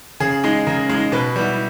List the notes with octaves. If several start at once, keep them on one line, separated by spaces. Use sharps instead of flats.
C#3 G#4
G#3 D#4
C#3 A#4
G#3 D#4
B2 B4
G3 B3 E4